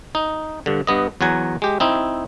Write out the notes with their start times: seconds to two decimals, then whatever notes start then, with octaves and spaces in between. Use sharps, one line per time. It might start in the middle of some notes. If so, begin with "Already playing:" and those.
0.15 D#4
0.66 G2 D3
0.87 G2 B3 D#5
1.21 E2 F#3 F#5 G#5 A#5
1.62 G#3 G4
1.80 C4 D#4 E4